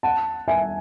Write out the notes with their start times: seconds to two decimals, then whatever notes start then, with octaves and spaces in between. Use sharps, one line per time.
0.03 F#5 A5
0.48 E5 G#5